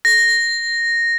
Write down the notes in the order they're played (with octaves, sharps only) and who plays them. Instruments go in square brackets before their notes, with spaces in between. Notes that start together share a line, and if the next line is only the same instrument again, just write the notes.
[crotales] A#6